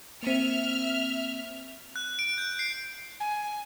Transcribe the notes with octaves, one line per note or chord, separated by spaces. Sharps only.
A#3 C4 E5 F6
F#6
D7
G6
C7
G#5